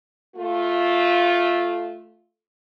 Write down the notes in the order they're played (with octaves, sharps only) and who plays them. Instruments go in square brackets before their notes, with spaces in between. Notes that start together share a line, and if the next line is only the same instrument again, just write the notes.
[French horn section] A3 F4